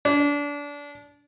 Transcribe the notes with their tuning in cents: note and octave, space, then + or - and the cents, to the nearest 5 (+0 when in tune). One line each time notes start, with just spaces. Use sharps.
D4 -25